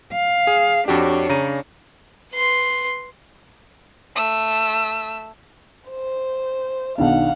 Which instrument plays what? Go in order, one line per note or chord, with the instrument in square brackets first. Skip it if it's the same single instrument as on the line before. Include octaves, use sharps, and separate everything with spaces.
[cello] F5
[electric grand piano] G#4
[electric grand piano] F2 F#4 G4 [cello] D4 C#5
[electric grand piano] C#3 A#5 D#7
[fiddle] B4 C6
[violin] A3 E6
[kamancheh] C5
[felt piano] B1 D#3 D4 [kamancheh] F5 F#5